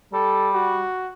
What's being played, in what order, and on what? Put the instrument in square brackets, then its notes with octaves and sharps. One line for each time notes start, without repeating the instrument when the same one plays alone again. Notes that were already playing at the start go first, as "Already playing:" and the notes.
[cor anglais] G3 [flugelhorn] A4
[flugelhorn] F#4